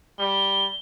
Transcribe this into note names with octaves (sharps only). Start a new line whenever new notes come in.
G3 G7